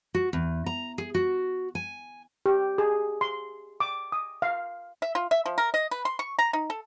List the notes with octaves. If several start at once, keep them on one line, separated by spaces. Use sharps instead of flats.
F#4
E2
A#5
G#4
F#4
G#5
G4
G#4
C6
D6
D#6
F5
E5
F4
E5
F3
A#4
D#5
B4
C6
C#6
A#5
D#4
A4